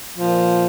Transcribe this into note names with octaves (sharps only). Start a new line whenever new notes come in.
A#2 F3